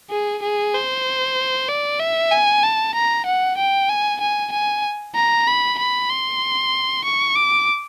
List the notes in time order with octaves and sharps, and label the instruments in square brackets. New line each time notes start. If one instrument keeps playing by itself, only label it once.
[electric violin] G#4
G#4
C5
D5
E5
G#5
A5
A#5
F#5
G5
G#5
G#5
G#5
A#5
B5
B5
C6
C#6
D6